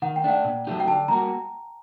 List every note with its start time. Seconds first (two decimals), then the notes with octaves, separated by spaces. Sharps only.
0.02 D#3 F#5
0.16 G5
0.24 A3 D4 F#5
0.45 A#2
0.67 F#3 A3 D#4 G4
0.80 G5
0.87 D3 A5
1.08 G3 A#3 F#4 A#5